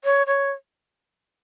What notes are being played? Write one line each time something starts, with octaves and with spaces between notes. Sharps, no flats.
C#5
C#5